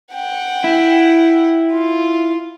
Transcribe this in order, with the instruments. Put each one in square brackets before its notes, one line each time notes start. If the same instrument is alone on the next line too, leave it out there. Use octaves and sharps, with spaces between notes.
[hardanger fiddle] F#5 G5
[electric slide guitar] E4
[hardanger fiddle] F4